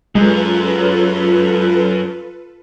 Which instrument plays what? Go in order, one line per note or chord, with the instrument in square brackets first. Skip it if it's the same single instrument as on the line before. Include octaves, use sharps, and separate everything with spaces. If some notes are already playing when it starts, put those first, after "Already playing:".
[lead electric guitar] F#2 [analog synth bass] G#3 [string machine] F4 A4 B4